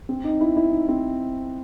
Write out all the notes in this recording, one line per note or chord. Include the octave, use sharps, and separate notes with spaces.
C4
D#4
E4
E4
D#4
C4